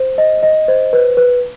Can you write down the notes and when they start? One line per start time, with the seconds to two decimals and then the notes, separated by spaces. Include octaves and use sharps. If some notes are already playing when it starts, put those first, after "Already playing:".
Already playing: C5
0.18 D#5
0.43 D#5
0.68 C5
0.93 B4
1.17 B4